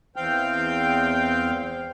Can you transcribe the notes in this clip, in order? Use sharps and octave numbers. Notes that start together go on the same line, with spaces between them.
E2 C4 F5 G5